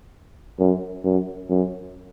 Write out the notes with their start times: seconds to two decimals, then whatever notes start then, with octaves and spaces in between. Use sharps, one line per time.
0.59 F#2
1.04 F#2
1.49 F#2